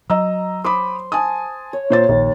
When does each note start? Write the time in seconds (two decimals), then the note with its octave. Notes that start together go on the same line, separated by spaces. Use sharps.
0.10 F#3 D#5 A#5 E6
0.64 C5 B5 D6 D#6
1.12 G#5 A5 D#6
1.73 C#5
1.90 A#2 C5 A6
2.09 A#1 D#2